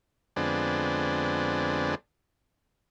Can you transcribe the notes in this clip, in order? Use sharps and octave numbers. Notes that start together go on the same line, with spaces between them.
F2 D3 G#3 B3 C4 D4